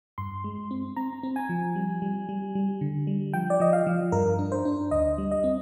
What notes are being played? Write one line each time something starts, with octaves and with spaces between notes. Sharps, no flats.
G2 C6
G#3
C4
C4 A#5
C4
G#5
F3
G3
G3
G3
G3
D3
G3
F3 G5
D5
F3 D#5
F5
F3
G2 A#4
D4
C5
D4
D2 D#5
G3
D#5
C4